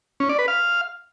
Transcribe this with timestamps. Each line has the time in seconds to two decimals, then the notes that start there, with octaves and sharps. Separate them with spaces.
0.20 C#4
0.29 D5
0.39 B4
0.48 F5